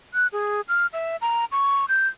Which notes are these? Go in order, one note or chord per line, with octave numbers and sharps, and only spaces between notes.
F#6
G#4
F6
E5
A#5
C#6
G6